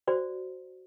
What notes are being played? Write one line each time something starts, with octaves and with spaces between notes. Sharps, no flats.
F#4 C5 D5